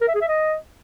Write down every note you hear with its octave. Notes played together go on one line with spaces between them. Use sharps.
A#4
E5
G#4
E5
D#5